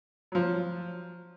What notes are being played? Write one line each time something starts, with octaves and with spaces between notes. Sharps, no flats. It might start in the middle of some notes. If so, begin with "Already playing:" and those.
F3 F#3